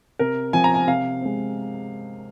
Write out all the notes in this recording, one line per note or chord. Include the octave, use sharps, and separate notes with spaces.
C3 A#4
F3 C4 G#5
A#5
G#5
C3 F5
G#3 C4